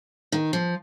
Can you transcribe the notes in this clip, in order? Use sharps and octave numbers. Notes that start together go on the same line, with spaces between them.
D#3
F3